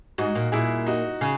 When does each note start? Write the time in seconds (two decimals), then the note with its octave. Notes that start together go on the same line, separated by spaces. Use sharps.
0.18 G#2 D#4 F#4
0.35 A#2
0.52 A#2 E4 G#4
0.86 D#4 F#4
1.21 C#3